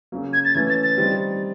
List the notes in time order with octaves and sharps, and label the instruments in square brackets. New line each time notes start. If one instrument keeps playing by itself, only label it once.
[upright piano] C#3 F#3 A#3
[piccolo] G#6
A6
[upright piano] E3 A3 C#4 [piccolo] G#6
[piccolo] A6
A6
[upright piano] D#3 G3 C4 D#4